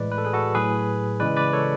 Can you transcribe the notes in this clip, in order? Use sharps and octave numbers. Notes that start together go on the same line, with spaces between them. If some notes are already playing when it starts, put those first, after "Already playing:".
Already playing: A2 E3 G#3 B4 D5
B4
A4
G#4 B4
F#4 A4
A2 F#3 G#4 B4
C#3 E3 G#3 B4 D5
B4 D5
A4 C#5